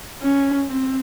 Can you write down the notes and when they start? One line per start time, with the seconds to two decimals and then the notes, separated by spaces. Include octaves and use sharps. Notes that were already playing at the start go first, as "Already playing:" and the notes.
0.22 C#4
0.66 C4